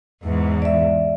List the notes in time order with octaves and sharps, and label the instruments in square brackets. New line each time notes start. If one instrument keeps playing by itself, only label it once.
[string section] E2 G#2
[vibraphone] D5 E5